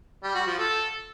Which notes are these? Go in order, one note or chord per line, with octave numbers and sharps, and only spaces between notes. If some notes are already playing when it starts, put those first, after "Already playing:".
G3
F#4
F3
A4